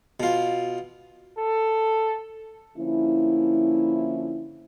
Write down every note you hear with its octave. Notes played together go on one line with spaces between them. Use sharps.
B2 F4
A4
D3 F3 A#3 C#4 E4